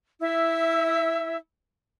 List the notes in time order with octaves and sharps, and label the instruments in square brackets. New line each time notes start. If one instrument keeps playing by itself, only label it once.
[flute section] E4 E5 E6